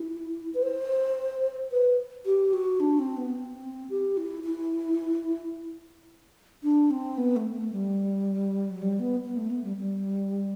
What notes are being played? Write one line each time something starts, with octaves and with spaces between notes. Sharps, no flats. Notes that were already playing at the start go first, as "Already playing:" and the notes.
Already playing: E4
B4
C5
B4
G4
F#4
D4
C4
B3
C4
G4
E4
E4
D4
C4
B3
A3
A3
G3
F#3
G3
B3
B3
A3
B3
G3
G3